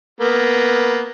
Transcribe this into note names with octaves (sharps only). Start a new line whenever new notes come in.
A#3 B3